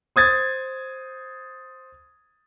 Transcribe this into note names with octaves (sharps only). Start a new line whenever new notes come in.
C5 D#6 G#6 A6